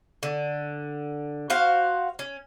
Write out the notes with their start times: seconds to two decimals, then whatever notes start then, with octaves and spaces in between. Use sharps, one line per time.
0.23 D3
1.50 F#4 C5 F5 F#5
2.19 C#4